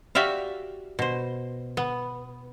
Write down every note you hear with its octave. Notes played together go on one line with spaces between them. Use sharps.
F#4 G4 D5 E5 F5
B2 C5
B3